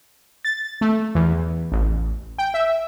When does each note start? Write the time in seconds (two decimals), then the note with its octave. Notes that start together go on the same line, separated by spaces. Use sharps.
0.45 A6
0.81 A3
1.15 E2
1.72 A1
2.38 G5
2.54 E5